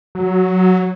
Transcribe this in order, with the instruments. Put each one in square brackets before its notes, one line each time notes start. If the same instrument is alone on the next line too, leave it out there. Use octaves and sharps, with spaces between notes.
[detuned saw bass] F#3